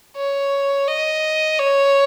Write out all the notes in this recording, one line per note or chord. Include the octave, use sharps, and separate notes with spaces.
C#5
D#5
C#5